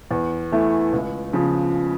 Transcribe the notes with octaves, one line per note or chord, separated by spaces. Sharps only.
E2
E3 A3 E4
C#2
C#3 F3